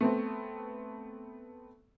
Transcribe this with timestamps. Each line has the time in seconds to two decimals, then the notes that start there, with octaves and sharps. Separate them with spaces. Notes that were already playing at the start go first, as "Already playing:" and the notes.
0.01 A3 B3 C4